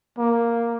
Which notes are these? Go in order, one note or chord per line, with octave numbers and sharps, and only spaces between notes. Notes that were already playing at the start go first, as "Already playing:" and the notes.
A#3